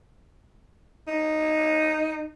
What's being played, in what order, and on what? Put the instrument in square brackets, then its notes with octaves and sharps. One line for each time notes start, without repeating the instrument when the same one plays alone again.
[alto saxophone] D#4